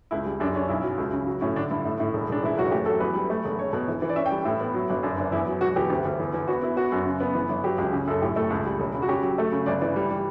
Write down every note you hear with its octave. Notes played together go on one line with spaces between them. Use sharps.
C#2 E4
G3
F#2 D4
C#4 D4
B1 E4
F#3
C#2
C#3
F#3
A2 C#4
D3 D4
G2 E4
A2
A2
E1
E1 D4
E3 E4
F#1 F#4
A3 G4
F#3 A4
E2 B4
G3
A3
E1
E1 C#5
B2
E3
E3
D5
C#4 E5
G5
G3
A2 E4
B3
F#3
G1
F#2 D4
F#1 D4
E2 E4
F#3
E1 F#4
E2 G4
D2
D2
E2
E2
B3 F#4
B3 E4
B3 F#4
F#2
C#3
B3
E3
G1
F#3 G4
C#2
C#3
F#2 A4
A2 G4
A3 A4
C#2
G3
E1
C#3
F#4
C#4 G4
F#3
A3 A4
C#3
G1 D5
E3 D5
G3
G3